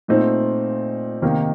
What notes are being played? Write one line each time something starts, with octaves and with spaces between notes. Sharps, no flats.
A#2 A3 C4 D#4
C3 D#3 A#3 D#4